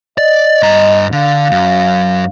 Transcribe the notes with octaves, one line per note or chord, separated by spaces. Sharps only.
D5 D#5
G2 A#5
D3 F5
F#2 F#3